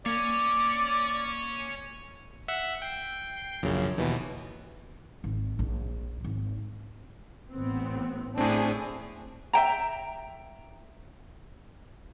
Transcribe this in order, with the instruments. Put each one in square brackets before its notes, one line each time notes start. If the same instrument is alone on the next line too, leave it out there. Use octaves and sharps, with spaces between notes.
[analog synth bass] A#3 [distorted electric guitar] C#5 G#5 [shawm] D5
[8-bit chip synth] E5 F#5
G5 C7
A#1 F#2 C#3
D#2 B2 E3
[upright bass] G#1
A#1
G#1
[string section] A1 B3 C4
[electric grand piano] A2 C4 [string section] D4 G#4
[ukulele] E5 G5 A#5